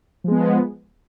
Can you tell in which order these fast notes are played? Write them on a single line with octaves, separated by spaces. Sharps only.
F3 G#3 B3